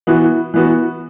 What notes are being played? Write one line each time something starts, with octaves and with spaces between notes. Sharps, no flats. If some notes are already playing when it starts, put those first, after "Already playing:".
E3 B3 F#4
E3 B3 F#4